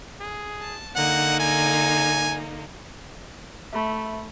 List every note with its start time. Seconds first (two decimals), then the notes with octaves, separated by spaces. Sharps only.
0.20 G#4
0.62 A5
0.96 D3 A#3 D#4 F#5
1.40 G#5
3.73 A3 E5 B5